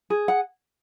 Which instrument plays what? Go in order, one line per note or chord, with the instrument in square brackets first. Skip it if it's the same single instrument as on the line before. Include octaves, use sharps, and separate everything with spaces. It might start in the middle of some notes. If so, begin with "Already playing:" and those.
[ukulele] G#4
F#5